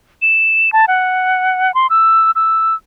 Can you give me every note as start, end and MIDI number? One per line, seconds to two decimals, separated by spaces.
0.22 0.70 100
0.73 0.85 81
0.88 1.74 78
1.75 1.87 84
1.90 2.31 88
2.35 2.75 88